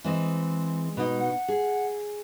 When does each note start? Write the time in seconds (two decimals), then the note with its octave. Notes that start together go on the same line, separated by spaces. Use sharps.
0.04 E3 G#3 C4 D#5
0.97 B2 D#4
1.19 F#5
1.48 G#4